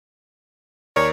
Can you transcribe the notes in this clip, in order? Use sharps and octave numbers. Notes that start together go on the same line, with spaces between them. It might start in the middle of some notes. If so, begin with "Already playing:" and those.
D#2 A#4 C#5 D5